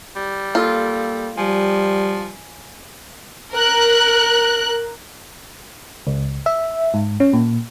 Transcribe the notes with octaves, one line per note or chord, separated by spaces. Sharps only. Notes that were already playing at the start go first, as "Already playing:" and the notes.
G3
A#3 F4 A4
F3 G3 G#5 D7
A#4 F#6
C#2
E5
G#2
C#4
A#2